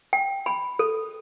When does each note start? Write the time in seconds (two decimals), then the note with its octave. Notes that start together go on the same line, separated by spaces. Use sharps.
0.13 G5
0.46 B5
0.79 A4